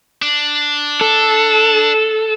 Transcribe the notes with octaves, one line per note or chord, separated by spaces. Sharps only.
D4
A4